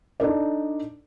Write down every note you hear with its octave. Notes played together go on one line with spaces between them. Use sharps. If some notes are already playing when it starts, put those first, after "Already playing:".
D4 D#4 A4 D5